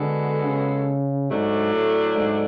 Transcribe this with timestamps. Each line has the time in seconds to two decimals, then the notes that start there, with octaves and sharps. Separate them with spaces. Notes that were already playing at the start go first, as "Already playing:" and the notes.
Already playing: D3 G#3 B3 F#4 A4
0.45 C#3
1.30 G#2 F#3 A3 D4
1.72 A2
2.16 G#2